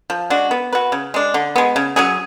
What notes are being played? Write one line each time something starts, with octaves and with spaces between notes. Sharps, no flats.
F3
G#3 D4 F#4
B3
F#4 B4
C#3
G#3 D4
D3
G#3 B3
C#3
F#3 C#4 G#4